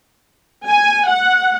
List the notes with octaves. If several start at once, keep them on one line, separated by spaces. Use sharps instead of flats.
G#5
F#5